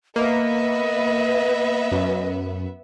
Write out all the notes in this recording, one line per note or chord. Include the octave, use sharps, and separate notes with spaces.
A#3 B3 B4 D#5 E5
F#2